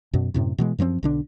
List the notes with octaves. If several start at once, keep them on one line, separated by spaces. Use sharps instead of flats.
F#2 B2
F#2 A2 C3
B2 E3 G#3
F#2 F3 B3 C4
B1 D3 D4